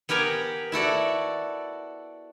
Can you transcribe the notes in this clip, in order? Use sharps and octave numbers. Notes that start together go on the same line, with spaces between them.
B3 G4 A#4 G#5 A#5
E4 F#4 A4 D5